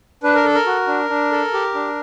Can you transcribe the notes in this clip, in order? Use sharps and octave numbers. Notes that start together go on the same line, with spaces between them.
D4 B4
A#4
A4
A#4
F#4
D4
D4
A4
G4
D4